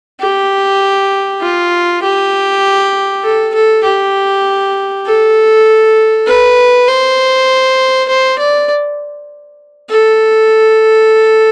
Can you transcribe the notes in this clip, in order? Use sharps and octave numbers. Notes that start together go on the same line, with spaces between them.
G4
F4
G4
A4
A4
G4
A4
B4
C5
C5
D5
A4